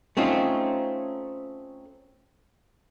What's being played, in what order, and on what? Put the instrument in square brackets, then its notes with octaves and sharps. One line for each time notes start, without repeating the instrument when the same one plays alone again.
[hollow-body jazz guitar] A3 C4 C#4 D#4 F4